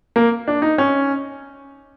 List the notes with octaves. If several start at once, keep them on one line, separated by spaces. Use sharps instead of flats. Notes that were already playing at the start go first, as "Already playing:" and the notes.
A#3
D4
D#4
C#4